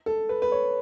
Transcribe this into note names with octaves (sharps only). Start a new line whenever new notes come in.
A4
B4
B4
C#5